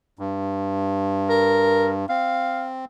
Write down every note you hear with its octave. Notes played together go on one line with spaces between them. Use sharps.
G2
A#4
C4 F5